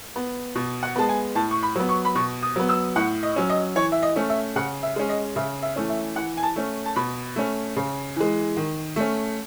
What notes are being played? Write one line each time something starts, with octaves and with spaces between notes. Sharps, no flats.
B3
B2
F#5
G#3 B3 A5
G#5
A2 A5
C#6
B5
F#3 B3
C#6
B5
B2 C#6
D#6
F#3 B3
E6
A2 F#5
D#5
F#3 C#4
D#5
E3 C#5
E5
D#5
A3 C#4
E5
C#3 F#5
E5
G#3 C#4
D#5
C#3 E5
E5
E3 A3 C#4
E5
E3 F#5
G#5
A5
A3 C#4
A5
B2 B5
A3 C#4
C#3
E3 G#3
D#3
A3 C#4